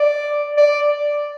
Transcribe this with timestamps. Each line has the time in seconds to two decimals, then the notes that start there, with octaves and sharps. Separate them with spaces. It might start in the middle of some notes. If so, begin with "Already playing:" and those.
Already playing: D5
0.58 D5